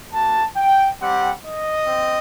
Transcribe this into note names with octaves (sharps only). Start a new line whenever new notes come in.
A#3 F#4 A5
G5
G3 C4 G4 F#5
D#5
C4